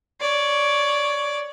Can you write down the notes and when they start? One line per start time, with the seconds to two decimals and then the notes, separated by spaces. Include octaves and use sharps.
0.20 C#5 D5